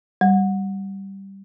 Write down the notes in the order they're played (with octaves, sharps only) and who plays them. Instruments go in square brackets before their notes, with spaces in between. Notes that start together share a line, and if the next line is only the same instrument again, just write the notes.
[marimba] G3